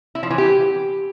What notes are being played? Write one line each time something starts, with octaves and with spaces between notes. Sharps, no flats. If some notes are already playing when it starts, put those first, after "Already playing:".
E4
F3
E3
G4